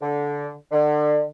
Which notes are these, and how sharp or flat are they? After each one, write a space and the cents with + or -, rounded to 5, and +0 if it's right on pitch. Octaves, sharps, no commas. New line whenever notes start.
D3 -15
D3 +30